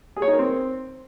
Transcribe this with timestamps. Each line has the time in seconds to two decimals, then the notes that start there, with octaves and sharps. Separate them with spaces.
0.16 G#4
0.22 C#5
0.28 D#4
0.33 A#4
0.39 C4